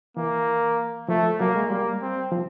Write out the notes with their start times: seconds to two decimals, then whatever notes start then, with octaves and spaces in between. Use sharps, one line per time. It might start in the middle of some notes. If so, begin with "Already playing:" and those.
0.17 E3 A#3
1.08 F3 A3
1.40 F#3 A#3
1.56 G#3
1.70 G3 A#3
2.02 C4
2.32 F3